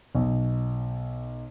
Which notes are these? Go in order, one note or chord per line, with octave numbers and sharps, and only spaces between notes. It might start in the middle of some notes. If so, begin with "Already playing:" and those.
B1